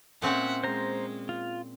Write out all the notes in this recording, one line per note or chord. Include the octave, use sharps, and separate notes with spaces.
A#2 C4 C#4 E5 F#5
G#3 C5 A#5
F4